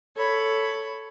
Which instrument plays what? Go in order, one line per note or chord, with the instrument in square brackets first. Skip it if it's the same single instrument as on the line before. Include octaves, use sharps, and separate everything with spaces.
[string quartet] A4 C#5 B5